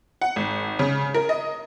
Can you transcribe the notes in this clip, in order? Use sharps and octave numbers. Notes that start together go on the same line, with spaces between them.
F#5
G#1
C#3
A#4
D#5